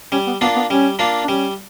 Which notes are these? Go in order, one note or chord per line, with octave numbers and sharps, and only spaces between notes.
G3 C#4
B3
A#3 B3 D4 F4
B3
G3 C#4
A#3 D4 F4
D4
G3 C#4